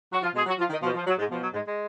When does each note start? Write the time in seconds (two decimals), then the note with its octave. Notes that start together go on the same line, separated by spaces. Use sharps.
0.11 F#3 F#4
0.22 F3 F4
0.34 B2 G#3 G#4
0.46 F#3 F#4
0.58 F3 F4
0.70 D#3 D#4
0.82 B2 F3
0.94 F3
1.06 F#3
1.17 G#2 G#3
1.30 B2 F3
1.41 F#3
1.54 G#2 G#3
1.65 G#3